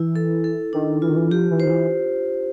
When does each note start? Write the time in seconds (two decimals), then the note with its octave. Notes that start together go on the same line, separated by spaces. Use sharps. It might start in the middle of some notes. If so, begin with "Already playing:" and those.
Already playing: E3 E4
0.16 A4
0.44 A4
0.73 D#3 D4
1.02 E3 F4
1.09 D#3
1.16 E3
1.31 F3 G4
1.50 E3
1.60 C5
1.65 D#3
1.70 E3